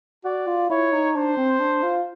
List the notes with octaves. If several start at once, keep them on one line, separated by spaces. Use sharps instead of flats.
F#4 D5
F4
E4 C#5
D#4
D4 C5
C4
D4
F4